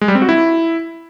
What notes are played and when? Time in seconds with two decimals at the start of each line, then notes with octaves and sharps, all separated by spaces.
0.01 G#3
0.08 G3
0.15 C4
0.22 F#4
0.29 E4